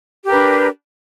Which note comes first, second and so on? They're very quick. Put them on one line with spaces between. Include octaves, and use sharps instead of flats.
G4 A#4 B4 D4